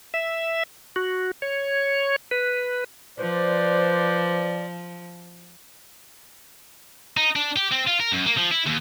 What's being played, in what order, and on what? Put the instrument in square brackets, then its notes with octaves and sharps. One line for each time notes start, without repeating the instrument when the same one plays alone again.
[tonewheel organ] E5
F#4
C#5
B4
[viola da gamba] F3 [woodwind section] B4 C5 D5
[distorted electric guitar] D#4
D4
G4
C4
F4
A#4
F#2
A#3
F3
E4
D#2